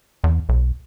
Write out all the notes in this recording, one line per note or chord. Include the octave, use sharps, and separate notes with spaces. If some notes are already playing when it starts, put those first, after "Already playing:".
E2
B1